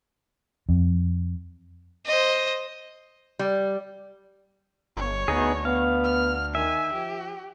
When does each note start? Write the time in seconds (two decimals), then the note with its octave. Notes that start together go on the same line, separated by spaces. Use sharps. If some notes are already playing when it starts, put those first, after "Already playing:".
0.69 F2
2.06 C5 D#5
3.39 G3
4.97 G1 C#5
5.28 D2 B3 D#4 G#4
5.65 B3 F5
6.04 F6
6.55 D#3 E5 G#5
6.93 F3 G4